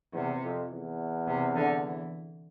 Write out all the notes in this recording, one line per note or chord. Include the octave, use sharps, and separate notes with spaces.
E2 C3
F2
E2
C3
D3
E3